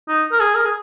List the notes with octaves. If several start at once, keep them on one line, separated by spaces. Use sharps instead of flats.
D#4
A#4
G#4
A#4
G#4